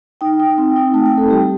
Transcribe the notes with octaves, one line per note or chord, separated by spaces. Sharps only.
D#4 G5
D#4
C4
D#4
A3 A5
G5
D#4
A4
G3 G4